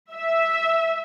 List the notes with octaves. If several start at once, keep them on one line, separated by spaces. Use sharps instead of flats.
E5